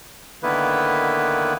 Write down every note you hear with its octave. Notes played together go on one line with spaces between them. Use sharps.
D3 D#3 A#3 B3 E4 B4